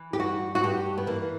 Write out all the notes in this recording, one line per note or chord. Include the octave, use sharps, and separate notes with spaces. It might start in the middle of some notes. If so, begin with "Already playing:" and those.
Already playing: E3
G4
G2 F#4
F#4
G2 G4
B3
E3 A#3